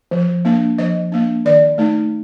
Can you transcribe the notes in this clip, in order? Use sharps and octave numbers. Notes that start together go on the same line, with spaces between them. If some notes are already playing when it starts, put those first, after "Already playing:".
F3
A#3 D4
F3 D#5
A#3 D4
D#3 D5
A3 D#4